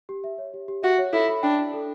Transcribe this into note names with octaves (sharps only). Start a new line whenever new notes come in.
G4
E5
C#5
G4
G4
F#4 E5
C#5
E4 A4
B5
D4 G5
D5
A4